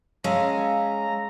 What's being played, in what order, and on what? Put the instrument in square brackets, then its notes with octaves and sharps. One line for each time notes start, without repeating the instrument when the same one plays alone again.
[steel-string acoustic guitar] G#3 [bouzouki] C#4 [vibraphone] F5 A5 E6 [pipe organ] A#5